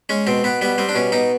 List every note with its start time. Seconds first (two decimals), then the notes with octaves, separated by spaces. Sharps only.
0.09 G#3 C#4
0.27 B2 C4
0.44 B2 B3
0.62 G3 B3
0.78 G3 C4
0.89 D4
0.95 B2 C#4
1.12 B2 D#4